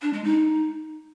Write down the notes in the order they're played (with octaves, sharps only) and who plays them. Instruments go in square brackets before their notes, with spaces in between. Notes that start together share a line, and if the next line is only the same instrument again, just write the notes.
[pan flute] D4
G#3
D#4